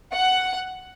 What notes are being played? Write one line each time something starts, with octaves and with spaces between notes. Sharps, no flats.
F#5